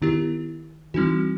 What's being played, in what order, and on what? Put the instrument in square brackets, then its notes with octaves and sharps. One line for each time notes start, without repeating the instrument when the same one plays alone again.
[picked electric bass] D#3 [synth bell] B3 E4 G4
[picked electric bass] E3 [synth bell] G3 C4 D#4 F#4